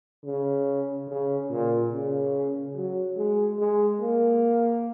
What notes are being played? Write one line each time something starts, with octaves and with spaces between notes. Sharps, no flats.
C#3
C#3
A#2
C#3
F#3
G#3
G#3
A#3